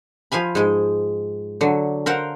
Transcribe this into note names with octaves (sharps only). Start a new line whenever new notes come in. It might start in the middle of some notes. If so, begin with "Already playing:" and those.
F3 F5 G#5 B5
G#2 G#3
D3 F#3
A#4 C5 F5 F#5